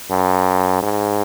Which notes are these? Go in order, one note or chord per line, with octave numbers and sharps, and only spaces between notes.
F#2
G#2